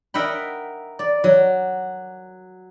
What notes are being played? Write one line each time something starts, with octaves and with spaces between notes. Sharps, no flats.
A#4 D#5 E5 F#5 G5 B5
D5
F#3